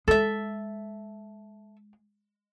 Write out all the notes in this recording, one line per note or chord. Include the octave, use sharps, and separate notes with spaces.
G#3 A4 E5